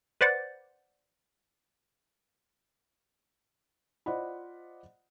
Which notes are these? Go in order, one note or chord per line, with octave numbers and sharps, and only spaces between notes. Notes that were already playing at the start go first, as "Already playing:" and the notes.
B4 C5 D5 F#5 A6
F4 C5 D5 D#5 F#5 B5